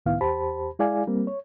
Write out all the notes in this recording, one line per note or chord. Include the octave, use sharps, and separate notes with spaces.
C#2 A2 D#3 B3 E4 F5
E2 G4 C5 A5 B5
G#3 E4 G#4 D5 F5 G#5
G3 A#3 C4
C#5